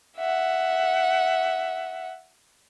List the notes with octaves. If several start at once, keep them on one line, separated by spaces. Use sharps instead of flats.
E5 F#5